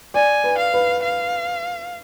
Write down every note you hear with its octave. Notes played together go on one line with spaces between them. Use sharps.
D5 G#5
B4
F5
B4
F5